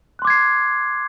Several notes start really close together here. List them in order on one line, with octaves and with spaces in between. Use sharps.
F#6 C6 D6 G#6 C7